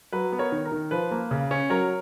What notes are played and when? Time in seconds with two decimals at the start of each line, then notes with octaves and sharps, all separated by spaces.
0.12 F#3 B4
0.32 B3
0.39 A#4 C#5
0.52 D#3
0.65 A#4
0.72 D#3
0.91 F3 B4
1.11 A#3
1.31 C#3
1.51 C#4
1.70 F#3 A#4 C#5